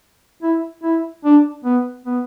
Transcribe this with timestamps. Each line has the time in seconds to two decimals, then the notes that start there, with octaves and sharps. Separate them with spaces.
0.42 E4
0.83 E4
1.25 D4
1.65 B3
2.05 B3